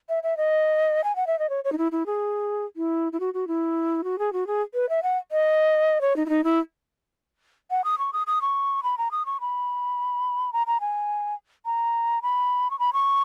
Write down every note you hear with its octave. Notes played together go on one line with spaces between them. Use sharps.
E5
E5
D#5
G#5
F#5
E5
D#5
C#5
C#5
D#4
E4
E4
G#4
E4
E4
F#4
F#4
E4
F#4
G#4
F#4
G#4
B4
E5
F#5
D#5
C#5
D#4
E4
D#4
E4
F#5
D#6
C#6
D#6
D#6
C#6
B5
A#5
D#6
C#6
B5
A#5
A#5
G#5
A#5
B5
C#6
B5
C#6